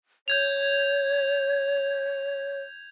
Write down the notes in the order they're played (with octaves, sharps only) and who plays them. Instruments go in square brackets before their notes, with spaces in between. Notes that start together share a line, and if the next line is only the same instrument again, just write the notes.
[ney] C#5 [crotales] G6 G#6 F7